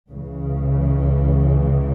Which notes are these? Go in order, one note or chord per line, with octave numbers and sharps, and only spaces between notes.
C#2 C#3 E3